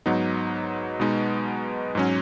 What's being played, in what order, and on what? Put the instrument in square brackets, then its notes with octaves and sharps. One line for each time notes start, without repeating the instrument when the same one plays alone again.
[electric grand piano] G#2 F#3 B3 D#4
B2 G#3 B3 D#4
G#2 F#3 C#4